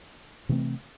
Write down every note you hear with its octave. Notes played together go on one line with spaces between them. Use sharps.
C3 E3 A3 C4